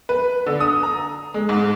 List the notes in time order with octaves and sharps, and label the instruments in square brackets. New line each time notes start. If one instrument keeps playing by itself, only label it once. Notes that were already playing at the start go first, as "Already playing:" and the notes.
[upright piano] B4
D3
D#6
A#5
G#3
G#2